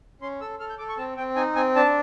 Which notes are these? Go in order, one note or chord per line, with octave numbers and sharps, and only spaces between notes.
C#4 C6
A4 E6
A4 F6
G6
A4 D6
C#6
C4 A5
C4 G5
D#4 G#5
C4 G#5
D4 A5